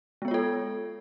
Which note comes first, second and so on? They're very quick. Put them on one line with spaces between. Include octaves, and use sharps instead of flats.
G#3 B3 C#5 F4 A4